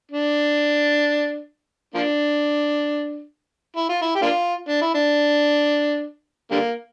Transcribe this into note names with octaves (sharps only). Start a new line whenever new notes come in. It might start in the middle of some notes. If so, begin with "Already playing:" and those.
D4
F3 A#3 D4
E4
F4
E4
G4
A#3 D4 F4
D4
E4
D4
D3 G3 A#3